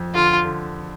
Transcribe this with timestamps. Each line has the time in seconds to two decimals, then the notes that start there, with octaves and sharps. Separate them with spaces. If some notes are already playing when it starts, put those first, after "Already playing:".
Already playing: F2
0.14 D3 F4
0.44 D3